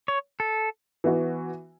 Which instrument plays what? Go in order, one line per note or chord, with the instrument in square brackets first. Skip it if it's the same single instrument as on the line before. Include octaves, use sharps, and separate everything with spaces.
[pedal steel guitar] C#5
A4
[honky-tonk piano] E3 B3 F#4